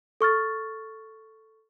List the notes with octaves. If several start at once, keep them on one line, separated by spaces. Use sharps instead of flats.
A4 C#6 F6 A6